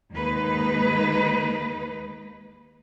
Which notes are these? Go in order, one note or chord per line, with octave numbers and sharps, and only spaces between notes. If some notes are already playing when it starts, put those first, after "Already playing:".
D#2 G#3 A#3 D#4 B4